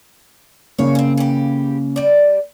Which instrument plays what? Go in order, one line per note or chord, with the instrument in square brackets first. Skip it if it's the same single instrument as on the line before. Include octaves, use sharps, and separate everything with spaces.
[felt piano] C#3 A#3 [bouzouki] C#5 F5
[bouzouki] C4 C#4
E3 G4
G3 D5